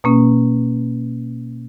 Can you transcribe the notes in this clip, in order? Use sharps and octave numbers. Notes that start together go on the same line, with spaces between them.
B2 A#3 C#4